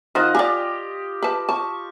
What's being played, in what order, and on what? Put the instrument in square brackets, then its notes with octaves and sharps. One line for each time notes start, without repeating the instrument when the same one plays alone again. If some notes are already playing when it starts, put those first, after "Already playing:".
[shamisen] D#3 C5 [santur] F4 D#5 F#5
[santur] G4 [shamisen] D5 E5 G#5
[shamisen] B4 A5
[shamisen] A5 [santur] C#6